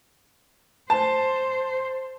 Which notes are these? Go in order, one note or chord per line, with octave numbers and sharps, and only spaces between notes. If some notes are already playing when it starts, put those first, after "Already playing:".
C5 A5